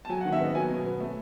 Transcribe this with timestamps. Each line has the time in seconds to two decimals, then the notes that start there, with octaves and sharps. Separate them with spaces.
0.05 A5
0.09 F#3 G#5
0.21 D#3 F#5
0.32 E5
0.40 B3 D#5
0.55 F#3 G#5
0.69 B2
0.85 B3
1.00 A3